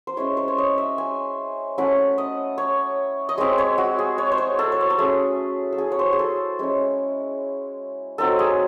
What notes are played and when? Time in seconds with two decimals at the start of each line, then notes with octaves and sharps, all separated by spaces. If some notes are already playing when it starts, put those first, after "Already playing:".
0.07 C5
0.17 G#3 C#4 E4 C#5
0.37 C5
0.48 C#5
0.58 D#5
0.78 E5
0.98 G#5
1.78 A3 C#4 E4 F#5
2.18 D#5
2.58 C#5
3.29 D#5
3.38 G#3 C4 E4 C#5
3.58 C#5
3.78 F#4
3.99 G#4
4.18 C#5
4.32 C5
4.38 C#5
4.59 A4
4.72 C#5
4.81 C5
4.90 A4
4.98 A3 C#4 E4 G#4
5.72 A4
5.78 G#4
5.92 C#5
5.99 C5
6.13 G#4
6.19 A4
6.59 G#3 C#4 E4
8.18 F#3 C4 D#4 A4
8.39 G#4